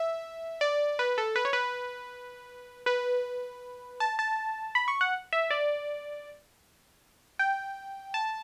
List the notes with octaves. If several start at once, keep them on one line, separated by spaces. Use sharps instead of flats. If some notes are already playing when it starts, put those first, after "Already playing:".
Already playing: E5
D5
B4
A4
B4
C#5
B4
B4
A5
A5
B5
C#6
F#5
E5
D5
G5
A5